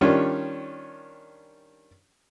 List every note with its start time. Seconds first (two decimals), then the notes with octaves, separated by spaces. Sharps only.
0.01 D#3 G3 C#4 D4 F4 C#5